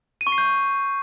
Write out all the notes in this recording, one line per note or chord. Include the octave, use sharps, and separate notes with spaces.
D#7
C#6
C7
G6